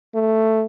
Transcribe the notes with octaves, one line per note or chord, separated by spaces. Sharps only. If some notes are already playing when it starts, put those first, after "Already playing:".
A3